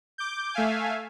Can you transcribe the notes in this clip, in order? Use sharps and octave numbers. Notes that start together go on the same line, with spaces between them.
D6 G6
A3 E5 F5 G#5